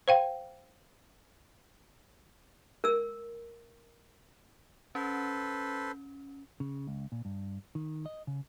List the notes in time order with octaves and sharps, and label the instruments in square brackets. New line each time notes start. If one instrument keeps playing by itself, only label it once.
[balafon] C5 F5 G5
[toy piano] A#4 E6
[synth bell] C#4 [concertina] A4 B4 C5
[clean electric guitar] C#3
C#2
A#2
G2
D#3
D#5
C#3